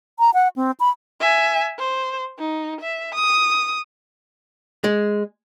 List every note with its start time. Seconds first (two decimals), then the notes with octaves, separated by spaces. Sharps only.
0.19 A#5
0.34 F#5
0.56 C4
0.80 B5
1.21 E5 G#5
1.78 C5
2.39 D#4
2.81 E5
3.14 D#6
4.84 G#3